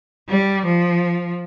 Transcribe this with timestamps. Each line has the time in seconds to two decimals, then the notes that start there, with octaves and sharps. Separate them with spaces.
0.29 G3
0.66 F3